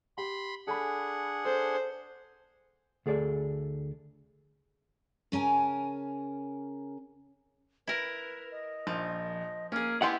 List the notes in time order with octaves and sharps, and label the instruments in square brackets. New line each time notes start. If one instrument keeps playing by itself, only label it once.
[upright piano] G4 [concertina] B5 C6
[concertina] D4 G#4 F#5 [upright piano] A4 G#5 B5
[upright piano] A4 [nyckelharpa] C5
[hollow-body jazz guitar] D2 G#4 A4 D5
[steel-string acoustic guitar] C#3 C#4 A#4 G#5 A5
[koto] E4 A#4 [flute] B4
[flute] D#5
[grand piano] A#1 [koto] F3
[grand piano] A#3 [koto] C#4 G#4 [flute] F6
[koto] B3 G4 E5 [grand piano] E4 [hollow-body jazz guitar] F#5 C6 [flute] G#5